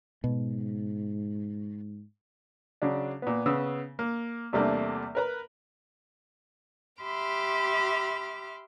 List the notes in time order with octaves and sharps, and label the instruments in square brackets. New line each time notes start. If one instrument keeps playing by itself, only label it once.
[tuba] G#2 [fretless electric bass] B2
[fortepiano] C#3 F#3 D4
A#2 B3
C#3 B3 D#6 E6
A#3
E2 C3 G3 A3 A#3 D4
A#4 B4 A#5
[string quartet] G4 E5 B5 C6 D6 F6